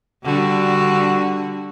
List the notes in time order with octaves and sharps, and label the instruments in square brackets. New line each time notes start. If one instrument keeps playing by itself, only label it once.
[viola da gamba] D3 G3 F#4